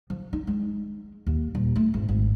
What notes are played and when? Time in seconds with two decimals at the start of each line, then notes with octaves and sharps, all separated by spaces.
0.10 F3
0.33 D#4
0.47 G#3
1.27 D#2
1.55 D#1
1.76 A3
1.94 G#1
2.09 G#1